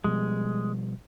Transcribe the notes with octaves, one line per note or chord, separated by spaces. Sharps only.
B2 F3 G3 G#3